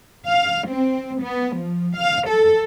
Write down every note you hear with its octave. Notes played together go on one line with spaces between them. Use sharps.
F5
C4
B3
F3
F5
A4